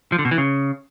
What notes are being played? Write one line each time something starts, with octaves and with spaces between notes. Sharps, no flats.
F3
D3
B2
E3
C#3